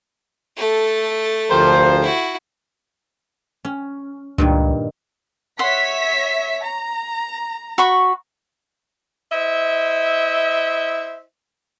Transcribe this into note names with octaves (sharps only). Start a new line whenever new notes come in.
A3 A4
D2 F3 G4 A#4 C5
E4 F#4
C#4
C#2 G2 A#2 D#3
C#5 E5 F#5 C6 B6
A#5
F#4 B5 C#6
E4 C5 D#5 E5